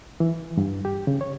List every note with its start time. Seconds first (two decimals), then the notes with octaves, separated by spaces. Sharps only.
0.20 E3
0.57 G2
0.85 G4
1.07 C#3
1.21 C#5